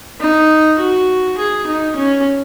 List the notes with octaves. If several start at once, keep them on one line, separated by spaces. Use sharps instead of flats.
D#4
F#4
G#4
D#4
C#4